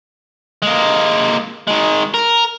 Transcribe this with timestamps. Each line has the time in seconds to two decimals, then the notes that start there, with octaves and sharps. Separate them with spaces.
0.62 G#3 A#3
1.67 D#3 G#3
2.14 A#4